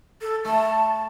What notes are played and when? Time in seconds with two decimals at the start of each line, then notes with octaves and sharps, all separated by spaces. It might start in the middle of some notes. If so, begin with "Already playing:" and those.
0.22 A4
0.45 A3 A5